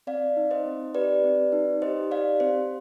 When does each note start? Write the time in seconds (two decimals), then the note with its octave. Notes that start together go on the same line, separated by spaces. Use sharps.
0.07 C4 D5 F5
0.37 D#4
0.51 C5 D#5
0.66 C4
0.95 G4 B4 D5
1.24 C4
1.52 D#4
1.82 G4 C5 D#5
2.11 G4 D5 F5
2.40 C4 C5